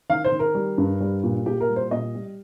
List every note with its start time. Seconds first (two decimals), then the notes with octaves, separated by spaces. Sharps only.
0.10 D#3 F5
0.24 C5
0.32 D#3
0.39 A#4
0.55 G3
0.78 G2
1.00 G3
1.23 A#2
1.46 A#2 G4
1.60 A#4
1.69 G3
1.76 C5
1.91 A#2 D#5
2.15 G3